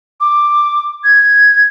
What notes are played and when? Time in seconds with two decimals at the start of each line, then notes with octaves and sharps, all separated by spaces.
0.21 D6
1.04 G#6